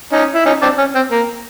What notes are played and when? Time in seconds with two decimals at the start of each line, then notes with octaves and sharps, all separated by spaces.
0.13 C#4 D#4
0.35 E4
0.46 C#4 D#4
0.62 C4 D4
0.78 C#4
0.95 C4
1.11 A#3